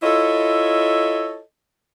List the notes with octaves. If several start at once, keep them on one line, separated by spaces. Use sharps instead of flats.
E4 F4 A4 C#5 D#5